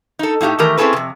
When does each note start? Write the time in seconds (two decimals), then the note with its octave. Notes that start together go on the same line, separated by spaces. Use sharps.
0.19 D#4 A4
0.41 A2 D#4 E4 G4
0.59 D#3 E3 A3 G4 A#4
0.78 C4 C#4 E4 G#4 A4 B4
0.93 F2 C3